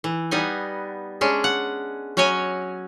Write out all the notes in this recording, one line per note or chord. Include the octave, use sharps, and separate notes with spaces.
E3
G3 B3 D#4 G#5
G#3 C#4 D4
F#5
F#3 C#4 C#5 D#5 G#5